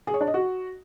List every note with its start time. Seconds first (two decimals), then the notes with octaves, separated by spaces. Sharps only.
0.07 G#4
0.14 C#5
0.21 D4
0.27 D#5
0.34 F#4